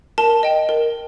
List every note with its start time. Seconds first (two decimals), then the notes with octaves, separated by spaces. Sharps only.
0.18 A#4 A5
0.43 D#5 G5
0.69 A#4